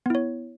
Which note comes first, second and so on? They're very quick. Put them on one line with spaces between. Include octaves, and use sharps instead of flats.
B3 E4 C#5